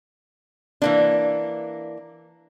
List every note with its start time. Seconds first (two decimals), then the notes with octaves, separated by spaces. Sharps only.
0.82 E3 A#3 D4